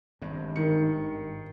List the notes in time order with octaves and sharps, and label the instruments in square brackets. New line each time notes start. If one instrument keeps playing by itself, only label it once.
[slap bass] G#1 G2
[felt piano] D#3 C#7